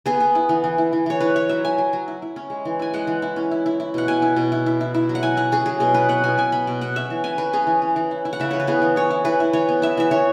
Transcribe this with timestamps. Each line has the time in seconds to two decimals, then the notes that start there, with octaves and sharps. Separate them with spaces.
0.06 B3 G#4
0.20 B3
0.35 E4
0.49 E3
0.64 E3
0.78 E4
0.93 E3
1.06 E3 C#5
1.20 E4 B4
1.36 E4 C#5
1.49 F#3 E5
1.64 E4 G#5
1.78 F#3
1.93 F#3
2.08 E4
2.22 E4
2.36 C#4
2.50 G#3
2.65 E3
2.79 E4 G#5
2.94 G#3 F#5
3.07 E3
3.22 E4
3.36 C#4
3.51 E4
3.66 E4
3.80 E4
3.94 B2 F#5
4.08 B2 G#5
4.22 E4
4.36 B2
4.52 E4
4.66 E4
4.81 E4
4.94 E4
5.09 F#3
5.15 F#5
5.23 E4 G#5
5.37 E4 F#5
5.52 C#4 G#4
5.66 F#3 G#4
5.80 B2 G#4
5.94 B3 B4
6.09 B3 F#5
6.24 B2 G#5
6.38 B2 G#5
6.52 B3 B5
6.67 B2
6.81 B2 F#5
6.96 C#4 E5
7.10 E3
7.24 C#4 G#5
7.38 E3 B4
7.53 C#4 G#4
7.67 E3
7.82 C#4
7.96 E3
8.11 E4
8.25 E4
8.33 F#5
8.40 C#3 E5
8.51 E3 C#5
8.60 B4
8.67 B3 G#4
8.82 E3
8.96 E4 C#5
9.10 E4
9.25 E3 B4
9.40 E4
9.53 E3 C#5
9.68 B3
9.82 E4 E5
9.97 E3 E5
10.11 E3 C#5